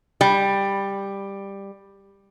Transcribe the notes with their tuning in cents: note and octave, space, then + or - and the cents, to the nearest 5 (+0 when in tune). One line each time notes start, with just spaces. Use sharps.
G3 +10